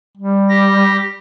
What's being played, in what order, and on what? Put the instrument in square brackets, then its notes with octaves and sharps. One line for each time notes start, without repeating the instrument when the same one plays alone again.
[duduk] G3
[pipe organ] G4 A#6